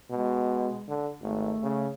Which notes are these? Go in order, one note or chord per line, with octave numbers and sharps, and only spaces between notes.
B2 G#3
D3
G#1 A3
C#3